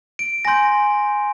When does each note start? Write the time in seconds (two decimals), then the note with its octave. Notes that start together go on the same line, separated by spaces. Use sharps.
0.19 D7
0.45 G#5 C6 G6 A#6